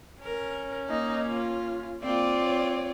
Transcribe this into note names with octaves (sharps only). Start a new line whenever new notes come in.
C#4 A#4
A#3 D#4
F4
A#3 C4 F4 D5
C#5